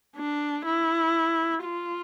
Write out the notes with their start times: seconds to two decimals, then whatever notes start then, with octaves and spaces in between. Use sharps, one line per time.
0.16 D4
0.65 E4
1.65 F4